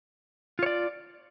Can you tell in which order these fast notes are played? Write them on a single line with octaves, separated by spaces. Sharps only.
F4 C#5 D5